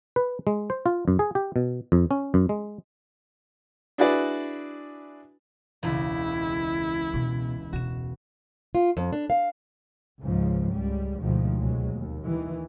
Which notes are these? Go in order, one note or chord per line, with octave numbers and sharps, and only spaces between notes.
B4
G#3
C5
F4
F#2
G#4
G4
B2
F2
C#4
F#2
G#3
D4 E4 F#4 G#4 B4 D5
E1 C#2 E4
B2
E1 F#4 E7
F4
F2
D4
F5
C#2 G#2 C#3 F3
C#2 G3
D2 G#2 B2 D#3 F3
F1 C#2 B2 F#3 G#3
D#2
D#3 E3